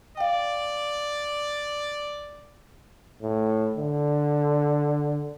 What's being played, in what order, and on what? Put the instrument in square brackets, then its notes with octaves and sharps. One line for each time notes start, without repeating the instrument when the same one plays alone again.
[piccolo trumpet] D5 [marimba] F5 G5
[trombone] A2
D3